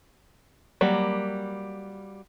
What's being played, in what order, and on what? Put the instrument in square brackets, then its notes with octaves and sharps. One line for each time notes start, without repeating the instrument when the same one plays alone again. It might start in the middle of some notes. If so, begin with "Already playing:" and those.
[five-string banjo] F#3 G3 A#3